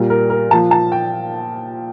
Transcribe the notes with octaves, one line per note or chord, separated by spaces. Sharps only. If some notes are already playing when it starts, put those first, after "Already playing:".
Already playing: A#2 G3
A#4
A#4
A#2 F3 A5
A5
G5